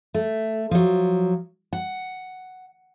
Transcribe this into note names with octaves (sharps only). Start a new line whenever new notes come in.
A3
F3 F#3
F#5